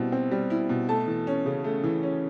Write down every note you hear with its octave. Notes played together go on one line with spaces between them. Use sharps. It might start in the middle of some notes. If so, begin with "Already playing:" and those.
Already playing: B2 G3 C4 E4
C4
G3
E4
B2
A3 A5
E3
C#4
C#3
A3
E3
C#4